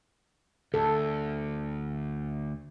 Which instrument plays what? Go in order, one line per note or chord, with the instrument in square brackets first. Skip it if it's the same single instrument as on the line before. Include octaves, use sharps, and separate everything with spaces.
[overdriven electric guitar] D2 [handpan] A4